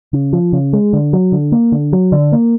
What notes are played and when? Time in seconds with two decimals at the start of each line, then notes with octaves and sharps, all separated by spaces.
0.13 C#3
0.33 F3
0.53 C#3
0.73 G#3
0.93 D3
1.13 F#3
1.32 D3
1.52 A#3
1.72 D3
1.93 F#3
2.12 D3
2.32 A#3